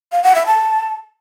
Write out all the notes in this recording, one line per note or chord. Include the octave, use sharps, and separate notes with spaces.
F5
F#5
E5
A5